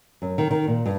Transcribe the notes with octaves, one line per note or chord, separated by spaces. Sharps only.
F#2
D#3
D#3
A#2
G2